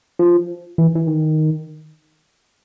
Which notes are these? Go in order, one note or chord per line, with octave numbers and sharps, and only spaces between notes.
F3
E3
E3
D#3